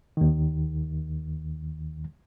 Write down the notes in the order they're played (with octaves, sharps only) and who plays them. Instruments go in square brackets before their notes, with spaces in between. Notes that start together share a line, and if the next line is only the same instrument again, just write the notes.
[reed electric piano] D#2 D#3